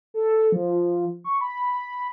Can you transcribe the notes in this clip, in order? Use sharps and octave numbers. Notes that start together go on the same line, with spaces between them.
A4
F3
C#6
B5